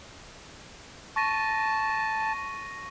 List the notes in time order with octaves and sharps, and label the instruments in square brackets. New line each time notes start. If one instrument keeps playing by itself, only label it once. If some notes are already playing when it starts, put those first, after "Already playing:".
[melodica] A5 [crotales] C#6 A#6 D#7